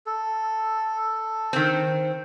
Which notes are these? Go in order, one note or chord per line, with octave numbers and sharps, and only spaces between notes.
A4
D#3 C4